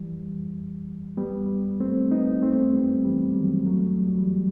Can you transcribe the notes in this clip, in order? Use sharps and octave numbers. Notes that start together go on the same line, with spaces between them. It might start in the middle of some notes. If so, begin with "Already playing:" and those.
Already playing: E3 G3
G3 B3
A3 C4
B3 D#4
A3 C4
G3 B3
E3 G3
D#3 F#3
F#3 A3
G3
F#3
E3 G3